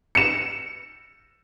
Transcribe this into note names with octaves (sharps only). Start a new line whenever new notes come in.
C#7 E7